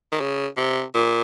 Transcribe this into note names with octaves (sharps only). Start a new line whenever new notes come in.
D#3
C#3
C3
A#2